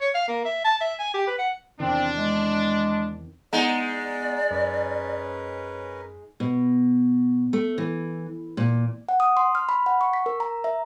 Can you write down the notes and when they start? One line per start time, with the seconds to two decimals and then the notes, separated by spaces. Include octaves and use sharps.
0.01 C#5
0.15 F5
0.28 A#3
0.45 E5
0.65 A5
0.81 E5
0.99 G#5
1.14 G4
1.27 B4
1.38 F#5
1.80 E2 C3 D#3 C4 D4
2.15 G#3
3.53 G#3 B3 D#4 D5 F#5 A#5
4.51 F#2 C#4 A#4 B4
6.40 B2
7.53 A3
7.78 E3
8.57 A#2
9.09 F#5
9.20 D#6
9.37 C6
9.55 F6
9.69 B5
9.86 F#5
10.01 C#6
10.13 B6
10.26 A#4
10.40 A#5
10.64 E5